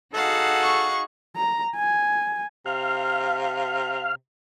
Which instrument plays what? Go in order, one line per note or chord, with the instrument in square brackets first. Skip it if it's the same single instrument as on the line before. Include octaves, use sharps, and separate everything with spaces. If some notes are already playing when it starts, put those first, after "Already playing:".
[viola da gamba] D#4 F#4 G#4 [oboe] A4 [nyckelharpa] F5 F#5
[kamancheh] C#6
[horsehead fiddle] A#5
G#5
[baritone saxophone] C3 [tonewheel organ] F5